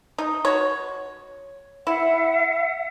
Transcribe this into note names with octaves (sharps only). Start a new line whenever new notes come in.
D#4
F#4 C#5
E4 E5 F#5